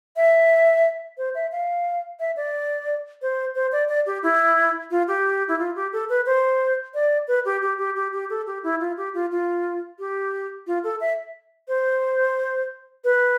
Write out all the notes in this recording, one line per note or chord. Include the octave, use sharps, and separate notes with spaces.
E5
C5
E5
F5
E5
D5
C5
C5
D5
D5
G4
E4
F4
G4
E4
F4
G4
A4
B4
C5
D5
B4
G4
G4
G4
G4
G4
A4
G4
E4
F4
G4
F4
F4
G4
F4
A4
E5
C5
B4